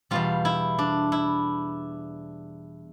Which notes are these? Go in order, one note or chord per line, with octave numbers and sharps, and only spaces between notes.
E2 B2 G3 F4
E4
D4
E4